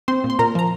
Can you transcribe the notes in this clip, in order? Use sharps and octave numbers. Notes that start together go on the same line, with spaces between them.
C4 C5 C6
A#2
C6
A#2 A#4 A#5
F3 A#5